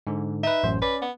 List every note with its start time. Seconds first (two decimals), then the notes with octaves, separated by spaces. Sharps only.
0.07 G#2 D3
0.43 D#4 B4 E5
0.63 A1 F#2 C5
0.82 C#4 B4 D5
1.01 B3